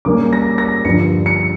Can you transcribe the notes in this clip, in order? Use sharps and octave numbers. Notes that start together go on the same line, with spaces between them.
C#3 G3 A#3 C#4 D6
A#6
A#6
G2 D3 F3 C#7
C#7